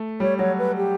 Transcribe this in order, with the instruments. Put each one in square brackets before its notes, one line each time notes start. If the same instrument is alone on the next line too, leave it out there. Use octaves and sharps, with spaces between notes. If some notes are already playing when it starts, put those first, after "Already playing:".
Already playing: [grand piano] A3
[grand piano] G3 [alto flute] C#5
[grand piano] F#3 [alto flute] C#5
[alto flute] B4
G4